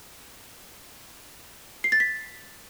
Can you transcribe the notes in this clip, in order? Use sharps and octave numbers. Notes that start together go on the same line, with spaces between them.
C7
A6
B6